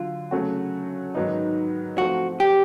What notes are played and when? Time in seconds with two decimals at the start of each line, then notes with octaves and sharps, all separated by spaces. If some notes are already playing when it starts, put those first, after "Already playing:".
Already playing: D3 F#3 F4
0.31 C#3 F#3 A3 C#4 F#4
1.15 G#2 D#3 F#3 B3 D#4
1.98 F3 A3 C4 F#4
2.40 G4